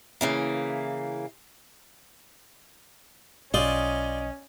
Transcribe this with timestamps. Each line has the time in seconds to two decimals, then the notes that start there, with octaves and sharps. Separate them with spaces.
0.21 C#3 E3 A#3
3.54 B1 C#4 F4 D5 D#5 G5